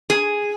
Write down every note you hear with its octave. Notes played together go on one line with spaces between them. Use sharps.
G#4